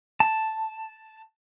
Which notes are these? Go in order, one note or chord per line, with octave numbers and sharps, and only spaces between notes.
A5